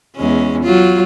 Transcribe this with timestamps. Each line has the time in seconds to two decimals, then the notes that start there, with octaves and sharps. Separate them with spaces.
0.16 E2 G#3 C#4
0.63 F#3 F4